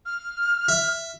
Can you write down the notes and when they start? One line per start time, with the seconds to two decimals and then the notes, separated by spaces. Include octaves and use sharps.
0.06 F6
0.68 E5